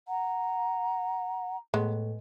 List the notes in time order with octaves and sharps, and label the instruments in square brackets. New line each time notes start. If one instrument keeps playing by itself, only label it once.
[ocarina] F#5 [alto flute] A#5
[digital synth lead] A2 [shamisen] G#3 B3